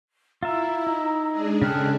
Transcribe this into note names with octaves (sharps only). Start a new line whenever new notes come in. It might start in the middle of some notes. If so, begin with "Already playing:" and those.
E4 F4 E5 A#5 E6
D#4
G#3 D4 G#4
C#3 A4 G5 F6 F#6